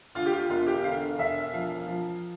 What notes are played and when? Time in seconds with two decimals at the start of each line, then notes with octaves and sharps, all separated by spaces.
0.15 D2 F4
0.26 G4
0.32 F4
0.49 E1 F4
0.67 G4
0.84 D3 F5
1.18 E1 E5
1.53 F3 F5
1.87 F3